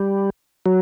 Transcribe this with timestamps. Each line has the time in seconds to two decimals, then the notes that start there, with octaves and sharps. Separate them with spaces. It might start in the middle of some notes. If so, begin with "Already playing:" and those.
Already playing: G3
0.66 F#3